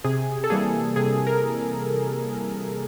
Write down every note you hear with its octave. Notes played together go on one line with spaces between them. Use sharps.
C3 G#4
A4
E3 G3 A#3 G#4
C3 G#4
A#4